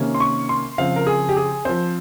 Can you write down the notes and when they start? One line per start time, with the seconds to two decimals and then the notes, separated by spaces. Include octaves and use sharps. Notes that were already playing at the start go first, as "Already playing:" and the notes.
Already playing: C3 D#3 A#3 C#4
0.15 C6
0.20 C#6
0.49 C6
0.78 C#3 F3 C4 F5
0.96 A#4
1.07 G#4
1.29 G4
1.37 G#4
1.65 F3 C4 C5